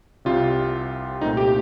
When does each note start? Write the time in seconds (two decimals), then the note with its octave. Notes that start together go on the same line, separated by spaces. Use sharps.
0.25 C2 C3 G3 C4 F4
1.21 C2 A#2 A3 C4 D#4
1.37 G4